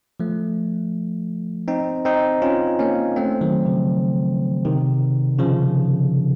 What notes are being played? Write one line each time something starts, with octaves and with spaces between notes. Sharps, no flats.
F3 A3
C4 D#4
C4 D#4
C#4 F4
A#3 C#4
A3 C4
D#3 F#3
C#3 F3
C3 D#3
C#3 F3